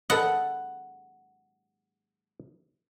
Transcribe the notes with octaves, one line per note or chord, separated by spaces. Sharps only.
A4 B4 D#5 F#5